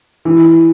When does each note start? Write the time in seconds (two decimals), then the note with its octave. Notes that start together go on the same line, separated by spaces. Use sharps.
0.25 E3